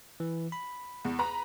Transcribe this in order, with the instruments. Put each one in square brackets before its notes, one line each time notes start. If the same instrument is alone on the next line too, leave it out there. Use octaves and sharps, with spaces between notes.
[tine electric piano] E3
B5
[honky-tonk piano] E2
B4 A#5 B5